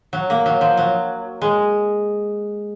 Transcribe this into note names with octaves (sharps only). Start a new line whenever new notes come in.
F#3
A#3
F#3
F3
F#3
G#3